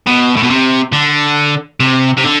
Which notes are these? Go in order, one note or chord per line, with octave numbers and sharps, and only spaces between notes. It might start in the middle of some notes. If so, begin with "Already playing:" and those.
B2
A2
B2
C3
D3
C3
C3
D3